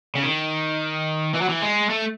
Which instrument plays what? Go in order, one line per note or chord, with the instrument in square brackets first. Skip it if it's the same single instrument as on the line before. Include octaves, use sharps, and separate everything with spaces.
[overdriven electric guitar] C#3
D#3
E3
F#3
E3
G#3
A3